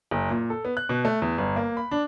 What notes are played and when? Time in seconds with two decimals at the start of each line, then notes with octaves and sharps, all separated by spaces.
0.11 F#1
0.30 A#2
0.50 A4
0.65 B3
0.77 F#6
0.89 B2
1.05 A3
1.22 E2
1.38 G1
1.56 A#3
1.77 B5
1.91 D4